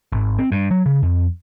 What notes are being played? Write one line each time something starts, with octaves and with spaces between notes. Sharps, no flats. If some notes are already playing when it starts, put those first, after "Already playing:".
G#1
C4
G2
F#3
C#3
F2